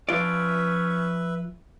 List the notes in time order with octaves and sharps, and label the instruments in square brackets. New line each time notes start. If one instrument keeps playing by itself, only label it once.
[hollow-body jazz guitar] F3 F4 D5 [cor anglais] C#4 [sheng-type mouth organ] B4 E5